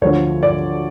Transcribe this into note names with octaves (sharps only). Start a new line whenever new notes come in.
D2 D3 F3 C#5
D5